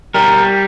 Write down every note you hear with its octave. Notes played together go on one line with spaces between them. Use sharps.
G3 A#4